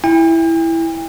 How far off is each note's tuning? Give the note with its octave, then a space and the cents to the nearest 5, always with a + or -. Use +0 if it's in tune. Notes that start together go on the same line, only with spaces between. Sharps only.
E4 +0 G5 +45